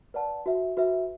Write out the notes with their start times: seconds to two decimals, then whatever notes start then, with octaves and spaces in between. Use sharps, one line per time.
0.14 B4 D5 F#5 A5
0.46 F#4 B4 E5
0.77 F#4 B4 E5